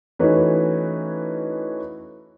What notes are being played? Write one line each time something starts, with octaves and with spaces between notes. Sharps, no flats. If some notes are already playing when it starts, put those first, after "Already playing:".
E3 A3 C#4 D#4 F#4 B4